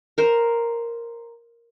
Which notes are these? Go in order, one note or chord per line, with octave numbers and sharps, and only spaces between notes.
A#4 C5